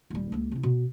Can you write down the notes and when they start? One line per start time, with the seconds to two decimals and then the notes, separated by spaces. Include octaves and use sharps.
0.10 D#1 G3
0.32 C#2 A#3
0.51 C3 E4
0.63 B2